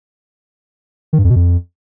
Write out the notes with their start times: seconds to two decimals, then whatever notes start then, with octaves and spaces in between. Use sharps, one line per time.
1.13 D#3
1.19 G2
1.24 F2
1.30 B2
1.36 F2